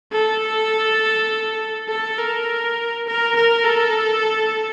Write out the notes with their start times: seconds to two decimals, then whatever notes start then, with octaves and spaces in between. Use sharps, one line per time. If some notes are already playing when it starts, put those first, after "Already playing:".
0.12 A4
1.89 A4
2.18 A#4
3.07 A#4
3.36 A#4
3.65 A4